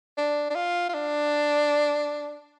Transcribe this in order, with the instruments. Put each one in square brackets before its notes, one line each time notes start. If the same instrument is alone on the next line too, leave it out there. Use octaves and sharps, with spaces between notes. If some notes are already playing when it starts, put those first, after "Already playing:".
[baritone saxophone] D4
D4
F4
F4
D4